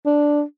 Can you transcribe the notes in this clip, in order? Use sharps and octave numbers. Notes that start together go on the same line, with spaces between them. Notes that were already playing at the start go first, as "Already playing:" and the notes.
D4